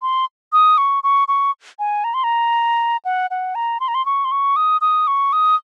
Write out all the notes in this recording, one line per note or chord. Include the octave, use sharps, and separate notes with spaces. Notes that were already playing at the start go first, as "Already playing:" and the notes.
C6
D#6
C#6
C#6
C#6
G#5
A#5
C6
A#5
F#5
F#5
A#5
C6
A#5
C6
C#6
C6
C#6
D#6
D#6
C#6
D#6